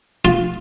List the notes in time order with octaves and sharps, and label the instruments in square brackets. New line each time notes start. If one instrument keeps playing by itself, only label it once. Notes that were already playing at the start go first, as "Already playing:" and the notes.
[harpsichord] F4